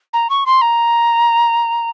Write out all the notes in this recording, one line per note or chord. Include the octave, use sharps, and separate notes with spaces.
A#5
C#6
C6
A#5